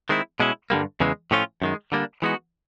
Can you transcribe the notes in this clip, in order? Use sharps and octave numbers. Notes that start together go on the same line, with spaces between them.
D#3 G#3 C4 E4
B2 G#3 C#4 E4
G2 D3 G3 A#3
E2 C#3 E3 G#3
A2 F3 A3 C#4 F4
F#2 D#3 G#3
D3 G3 A#3 D4
E3 G#3 B3 D#4 F#4